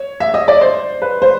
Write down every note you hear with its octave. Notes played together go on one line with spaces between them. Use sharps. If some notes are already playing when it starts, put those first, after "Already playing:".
Already playing: C#5
E5
D#5
D5
C5
B4
C5